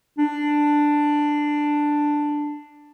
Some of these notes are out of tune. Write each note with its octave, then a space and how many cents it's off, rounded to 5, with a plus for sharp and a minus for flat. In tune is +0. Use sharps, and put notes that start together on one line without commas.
D4 +5